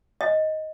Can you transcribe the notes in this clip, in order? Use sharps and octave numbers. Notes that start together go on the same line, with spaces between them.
D#5